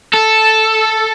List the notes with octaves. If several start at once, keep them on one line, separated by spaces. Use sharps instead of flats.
A4